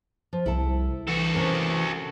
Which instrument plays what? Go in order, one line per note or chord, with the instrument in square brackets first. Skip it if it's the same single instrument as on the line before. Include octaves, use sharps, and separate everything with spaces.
[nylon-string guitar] F3
[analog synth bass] C2 [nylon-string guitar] E4 A4 A5
[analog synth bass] E3 [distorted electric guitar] F#4 A4
[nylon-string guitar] C3 C#4 A#4